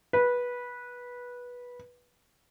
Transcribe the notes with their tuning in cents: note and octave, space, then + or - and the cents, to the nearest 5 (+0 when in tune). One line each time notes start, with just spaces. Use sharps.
B4 -15